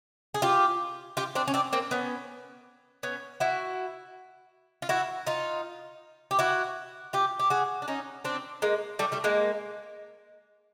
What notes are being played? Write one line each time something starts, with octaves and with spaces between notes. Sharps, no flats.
G#4
F4 G4
F4 G4
C4 D4
C#4
C4 D4
A#3 C4
B3 C#4
B3 C#4
E4 F#4
F4
E4 F#4
D#4 F4
G4
E4 F#4
F4 G4
G4
F#4 G#4
D4
C#4 D#4
C4 D4
G#3 A#3
G3 A3
G3 A3
G#3 A#3